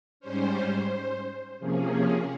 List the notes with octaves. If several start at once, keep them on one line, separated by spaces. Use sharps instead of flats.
G#2 G3 C#4 C5
C3 F3 A#3 C#4 G#4